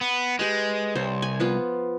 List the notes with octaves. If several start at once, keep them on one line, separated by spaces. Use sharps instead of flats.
B3
G#3 G4 B4
C2 C5 C#5
G#5
F3 B3 F4